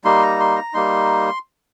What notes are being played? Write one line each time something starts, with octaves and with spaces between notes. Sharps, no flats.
G3 A#3 D#4 C6
A#5
C6
A#5
G3 A#3 D#4 C6